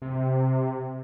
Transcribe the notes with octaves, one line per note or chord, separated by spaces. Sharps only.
C3